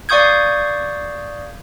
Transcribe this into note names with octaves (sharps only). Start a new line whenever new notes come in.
D5 F5 C#6 D#6 G6 G#6